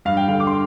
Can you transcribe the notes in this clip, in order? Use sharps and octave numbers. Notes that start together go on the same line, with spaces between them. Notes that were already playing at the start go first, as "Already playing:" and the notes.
G2 F5
G5
D3 F5
D6
C6